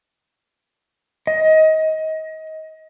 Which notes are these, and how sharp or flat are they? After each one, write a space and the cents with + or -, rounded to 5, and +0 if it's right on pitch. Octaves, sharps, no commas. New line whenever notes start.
D#5 +25